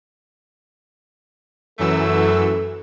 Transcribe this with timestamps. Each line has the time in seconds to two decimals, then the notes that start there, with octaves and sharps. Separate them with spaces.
1.79 F#2 E3 F#3 A3 A4 E6